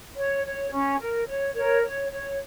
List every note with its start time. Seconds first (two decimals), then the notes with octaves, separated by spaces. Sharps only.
0.16 C#5
0.44 C#5
0.71 C#4
0.99 A#4
1.27 C#5
1.54 A#4 C#5
1.82 C#5
2.10 C#5